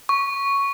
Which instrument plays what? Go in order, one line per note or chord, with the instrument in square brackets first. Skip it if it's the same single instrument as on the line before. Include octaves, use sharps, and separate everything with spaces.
[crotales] C#6